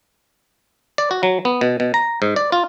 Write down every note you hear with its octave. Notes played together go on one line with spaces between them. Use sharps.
D5
F#4
F#3
B3
B2
B2
A#5
G#2
D5
F4